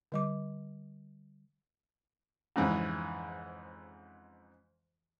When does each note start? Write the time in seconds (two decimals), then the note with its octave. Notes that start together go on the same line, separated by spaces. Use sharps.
0.12 D3 G3 D6
2.56 F2 G#2 C#3 E3